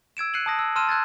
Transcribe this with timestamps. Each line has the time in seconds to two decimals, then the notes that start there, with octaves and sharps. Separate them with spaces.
0.17 E6 G#6 D7 E7
0.34 F#6 C7 C#7 D#7 F#7
0.46 A5 D#6 A#6
0.59 E6
0.76 A5 C6 E6 F6 D#7 E7
0.89 E6 F#6 G#6 A6